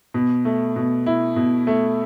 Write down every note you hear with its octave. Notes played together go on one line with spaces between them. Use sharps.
B2
A3
B2
E4
B2
A3